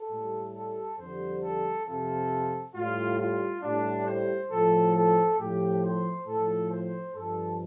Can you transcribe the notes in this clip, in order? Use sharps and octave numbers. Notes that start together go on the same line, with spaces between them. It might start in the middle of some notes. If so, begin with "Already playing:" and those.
Already playing: A4
A2 G3
A4
F2 D3 G3 C5
A4
F2 C3 F3 A4
A2 G3 F4
F4
A2 G3 D4
C5
A2 F3 A4
A4
A2 F3 G4
C5
A2 F3 A4
C5
G2 F3 A4